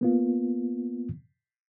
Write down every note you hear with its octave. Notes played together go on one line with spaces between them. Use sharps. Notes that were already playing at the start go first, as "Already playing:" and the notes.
A#3 B3 F4